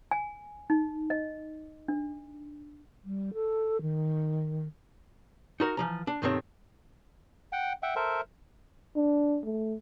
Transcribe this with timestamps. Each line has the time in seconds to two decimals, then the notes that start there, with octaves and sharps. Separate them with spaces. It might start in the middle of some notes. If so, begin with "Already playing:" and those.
0.11 G#5
0.70 D#4
1.10 D#5
1.88 D4
3.04 G3
3.34 A4
3.81 D#3
5.60 D#4 F#4 A#4
5.77 E3 F3 A#5
6.07 D4
6.22 B1 G2 D#3 A3 C4 C#5
7.53 F#5 G5
7.83 E5 F#5 G5
7.96 A4 A#4 C5 E5
8.96 D4
9.45 A3